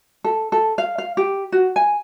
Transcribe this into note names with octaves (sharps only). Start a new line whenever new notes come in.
A4
A4
F5
F5
G4
F#4
G#5